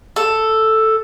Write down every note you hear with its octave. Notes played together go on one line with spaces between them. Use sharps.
A4